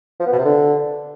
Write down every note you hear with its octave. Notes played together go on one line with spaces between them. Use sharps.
F3
B3
B2
C3
D3